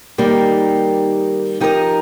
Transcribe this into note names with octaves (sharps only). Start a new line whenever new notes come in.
D#3 G3 A#3 D#4 G4
F3 D#4 G4 A#4 D#5